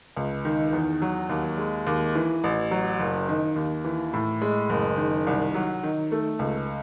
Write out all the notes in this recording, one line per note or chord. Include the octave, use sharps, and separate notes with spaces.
C#2
D#3
E2
F#3
D#2
G#3
D#2
E3
A1
F#3
F#1
D#3
D#2
E3
A2
G#3
F#1
D#3
C2
F#3
D#3
A3
C#2